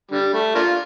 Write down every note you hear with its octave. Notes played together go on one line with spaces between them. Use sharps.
D3 G3
A3
A#3 D4 F4